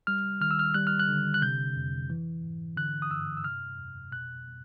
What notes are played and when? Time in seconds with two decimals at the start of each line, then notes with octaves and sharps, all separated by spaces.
0.07 G3 F6
0.41 D#3 F6
0.51 E6
0.59 F6
0.74 G3 F#6
0.87 F6
0.99 F#6
1.09 D3
1.34 F#6
1.42 C3 G6
1.76 F2
2.10 E3
2.44 G#2
2.77 D3 F#6
3.02 D#6
3.10 G2 E6
3.37 E6
3.44 C3 F6
3.78 F2
4.12 B2 F#6